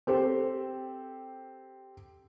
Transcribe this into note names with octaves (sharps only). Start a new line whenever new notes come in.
C4 G4 A4 C5